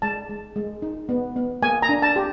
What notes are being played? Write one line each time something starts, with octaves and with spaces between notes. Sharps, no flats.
G#3 A5
G#3
G#3
D#4
B3
B3
A#3 G#5
A#5
D4
A5
G4